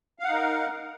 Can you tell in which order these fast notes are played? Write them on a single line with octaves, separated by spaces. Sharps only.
F5 F#5 D#4 A#4